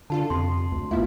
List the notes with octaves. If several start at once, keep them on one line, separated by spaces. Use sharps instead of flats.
D3 D4 F4 A4 A5
F2 C3 C6
D2
A1 A3 B3 E4 F4 F5